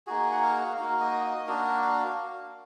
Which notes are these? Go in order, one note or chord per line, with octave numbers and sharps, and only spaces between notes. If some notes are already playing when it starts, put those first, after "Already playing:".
A#3 D#4 F#4 G#4
F#5
F5
A#3 D#4 F#4 F5
D#5
D#5
A#3 D4 F#4 F5
F5